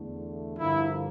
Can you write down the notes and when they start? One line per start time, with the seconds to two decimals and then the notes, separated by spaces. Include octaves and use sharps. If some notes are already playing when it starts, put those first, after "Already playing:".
Already playing: E2 D3 A3
0.58 G2 D3 F3 A#3 E4